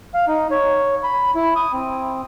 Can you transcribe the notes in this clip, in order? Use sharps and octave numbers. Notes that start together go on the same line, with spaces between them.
F5
D#4
C#5
B5
E4
D#6
C4